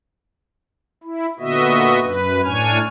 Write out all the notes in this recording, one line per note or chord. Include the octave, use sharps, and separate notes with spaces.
E4
A#2 D3 B3 F#4 D#5 E5
F#2 B4
A2 D4 C#5 G#5 F6 G#6